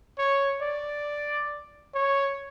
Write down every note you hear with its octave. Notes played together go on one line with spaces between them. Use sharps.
C#5
D5
C#5